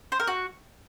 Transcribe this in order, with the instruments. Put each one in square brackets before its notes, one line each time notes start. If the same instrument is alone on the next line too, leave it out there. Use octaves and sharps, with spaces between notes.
[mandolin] C5
A#4
F#4